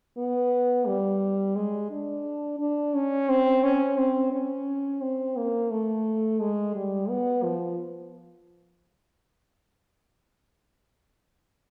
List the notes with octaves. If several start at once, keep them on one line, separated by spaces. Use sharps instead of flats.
B3
G3
G#3
D4
D4
C#4
C4
C#4
C4
C#4
C4
A#3
A3
G#3
G3
B3
F3